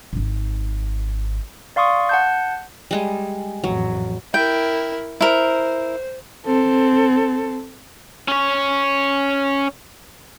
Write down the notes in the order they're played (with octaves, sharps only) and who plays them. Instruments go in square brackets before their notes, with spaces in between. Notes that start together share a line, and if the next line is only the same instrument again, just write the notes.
[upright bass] G#1 D#4
[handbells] D5 F5 C6 C#6 D#6
F#5 A5 G6
[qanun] G3 G#3 G#4
[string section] A1 F2 [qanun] F#3
[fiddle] E4 A#4 [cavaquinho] G5
[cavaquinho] E4 A#4 [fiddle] C5
[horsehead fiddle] C4 A4
[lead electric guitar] C#4 C#5